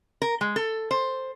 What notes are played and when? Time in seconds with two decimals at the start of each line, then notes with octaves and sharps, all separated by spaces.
0.22 A#4
0.41 G#3
0.56 A4
0.91 C5